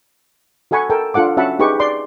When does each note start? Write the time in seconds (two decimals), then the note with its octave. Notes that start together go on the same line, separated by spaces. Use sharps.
0.71 F#4 A4 F#5 G#5 B5 C#6
0.90 A4 A#4 G5
1.14 D4 F4 A4 F#5 D6
1.37 C#4 F#4 E5 F#5 A5 B5
1.59 D#4 G4 G#4 B4 C#6
1.80 D5 C6 D6